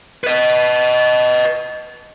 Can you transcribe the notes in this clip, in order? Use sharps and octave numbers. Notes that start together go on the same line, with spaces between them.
B4 D#5